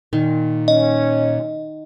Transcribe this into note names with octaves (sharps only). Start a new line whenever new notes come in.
A#2 D#3
C#4 D#5